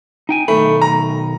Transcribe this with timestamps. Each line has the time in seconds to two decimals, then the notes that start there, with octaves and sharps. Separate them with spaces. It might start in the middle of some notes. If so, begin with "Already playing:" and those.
0.29 D#4 G5 G#5
0.48 B1 D#3 A3 B5
0.82 A#5